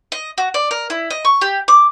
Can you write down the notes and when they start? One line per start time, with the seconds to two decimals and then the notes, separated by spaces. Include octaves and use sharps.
0.12 D#5
0.38 F#4
0.54 D5
0.71 A#4
0.90 E4
1.10 D#5
1.25 C#6
1.41 G4
1.68 D6